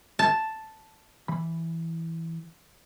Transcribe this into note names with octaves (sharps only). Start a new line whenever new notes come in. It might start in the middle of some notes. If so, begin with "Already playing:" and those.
A5
E3 B5